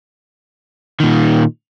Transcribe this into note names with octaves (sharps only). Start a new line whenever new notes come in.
A#2 D#3